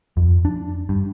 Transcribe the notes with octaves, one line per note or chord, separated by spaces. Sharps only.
F2
D4
G2